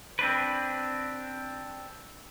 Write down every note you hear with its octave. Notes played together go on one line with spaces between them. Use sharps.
C4 D4 B4